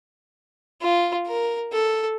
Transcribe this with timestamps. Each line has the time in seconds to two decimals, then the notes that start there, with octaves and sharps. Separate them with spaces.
0.82 F4
1.27 A#4
1.73 A4